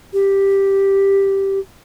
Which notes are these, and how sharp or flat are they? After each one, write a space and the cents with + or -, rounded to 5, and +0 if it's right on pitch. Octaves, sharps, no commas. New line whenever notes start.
G4 +0